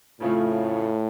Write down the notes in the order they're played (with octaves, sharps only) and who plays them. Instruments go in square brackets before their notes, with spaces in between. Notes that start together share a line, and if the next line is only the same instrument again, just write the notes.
[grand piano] F2 C#3 F3 A3 [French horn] A2